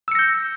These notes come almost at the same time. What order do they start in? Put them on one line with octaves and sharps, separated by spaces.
E6 C#7 A#6 G6